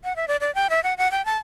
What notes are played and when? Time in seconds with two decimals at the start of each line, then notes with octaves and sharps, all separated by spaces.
0.04 F#5
0.16 E5
0.28 D5
0.41 D5
0.55 G5
0.70 E5
0.84 F#5
0.98 F#5
1.12 G5
1.25 A5